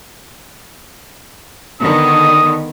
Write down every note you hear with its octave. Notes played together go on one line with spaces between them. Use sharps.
D3 D#3 B3 D#6